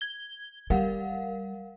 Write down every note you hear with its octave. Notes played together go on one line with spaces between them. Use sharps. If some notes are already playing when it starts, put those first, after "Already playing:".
G#6 G7
G3 A#4 F5 F#5